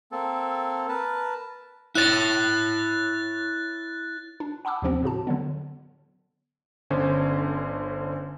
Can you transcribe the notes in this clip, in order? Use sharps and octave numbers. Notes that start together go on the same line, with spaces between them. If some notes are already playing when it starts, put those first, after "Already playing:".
A#3 C4 A4
A#4 B4 A5
E4 C#5 F#6 A6
D4
F#5 A5 B5 D6 E6
D#2 C3 F3 B3 C4
A2 C#3 F#4 A5
D3 F#3 B3
G1 D3 C#4 C5